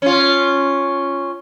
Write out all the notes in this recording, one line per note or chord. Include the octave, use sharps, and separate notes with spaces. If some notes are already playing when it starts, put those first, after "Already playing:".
C#4 F4